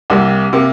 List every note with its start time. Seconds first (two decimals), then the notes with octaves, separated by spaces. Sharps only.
0.10 C2 C3 A#3
0.53 C3 A#3